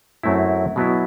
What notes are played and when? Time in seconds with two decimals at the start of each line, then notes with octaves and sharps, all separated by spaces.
0.23 F#2 F#3 A3 C4 E4
0.76 B2 F#3 B3 E4